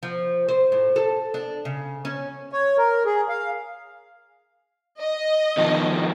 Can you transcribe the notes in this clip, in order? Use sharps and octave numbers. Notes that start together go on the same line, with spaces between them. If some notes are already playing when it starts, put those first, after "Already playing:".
F3
C5
A2
A4
D4
C#3
C#4
C#5
A#4
G#4
F5
D#5
B2 D#3 F3